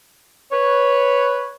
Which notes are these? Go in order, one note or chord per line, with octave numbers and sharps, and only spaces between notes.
B4 C#5